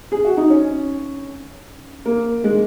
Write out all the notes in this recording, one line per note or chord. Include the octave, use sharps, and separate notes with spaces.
G#4
F#4
D#4
C#4
A#3
G#3